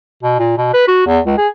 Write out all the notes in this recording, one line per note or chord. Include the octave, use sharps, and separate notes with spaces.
B2
A#2
B2
B4
F#4
E2
C#2
G#4